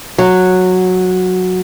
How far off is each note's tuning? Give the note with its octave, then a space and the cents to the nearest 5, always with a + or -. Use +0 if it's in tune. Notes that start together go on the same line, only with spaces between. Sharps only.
F#3 -10